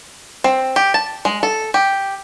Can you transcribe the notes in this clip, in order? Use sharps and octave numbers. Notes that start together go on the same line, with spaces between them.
C4
G4
A5
G#3
A4
G4